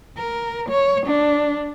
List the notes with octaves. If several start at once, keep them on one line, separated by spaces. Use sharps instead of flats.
A#4
C#5
D4